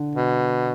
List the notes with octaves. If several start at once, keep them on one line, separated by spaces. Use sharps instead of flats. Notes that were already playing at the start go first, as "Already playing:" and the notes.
Already playing: D3
B2